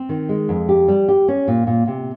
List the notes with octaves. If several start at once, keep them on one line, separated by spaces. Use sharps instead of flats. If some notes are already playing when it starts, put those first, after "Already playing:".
Already playing: C4
D#3
G#3
F2
G4
G3
G4
C#4
A#2
A#2
C3